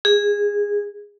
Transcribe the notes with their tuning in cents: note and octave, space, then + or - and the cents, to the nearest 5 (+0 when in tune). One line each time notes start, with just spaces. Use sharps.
G#4 -15